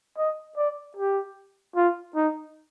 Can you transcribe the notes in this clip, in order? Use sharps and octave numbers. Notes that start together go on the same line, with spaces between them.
D#5
D5
G4
F4
D#4